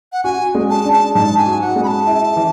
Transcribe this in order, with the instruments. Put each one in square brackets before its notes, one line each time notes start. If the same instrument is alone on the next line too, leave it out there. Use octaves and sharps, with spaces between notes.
[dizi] F#5
[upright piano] F#4 [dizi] G#5
[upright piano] G#3
[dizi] A5
[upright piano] D4
[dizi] A5
[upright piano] G#2 [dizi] A5
[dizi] G#5
[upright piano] F#4
[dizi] F#5
[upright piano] G#3
[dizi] B5
A5
[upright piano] E4
E3